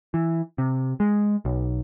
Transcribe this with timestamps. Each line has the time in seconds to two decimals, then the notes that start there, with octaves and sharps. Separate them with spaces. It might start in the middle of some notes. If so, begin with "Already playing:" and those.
0.14 E3
0.58 C3
1.00 G#3
1.45 B1